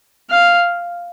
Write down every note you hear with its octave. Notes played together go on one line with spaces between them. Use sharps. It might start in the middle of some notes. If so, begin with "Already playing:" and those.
F5